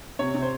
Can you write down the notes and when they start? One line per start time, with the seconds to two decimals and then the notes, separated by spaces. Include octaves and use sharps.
0.19 C3 C#5
0.34 C3
0.42 C5